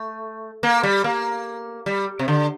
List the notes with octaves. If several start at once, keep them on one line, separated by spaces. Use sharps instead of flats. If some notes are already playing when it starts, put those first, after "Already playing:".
Already playing: A3
A#3
G3
A#3
G3
C3
D3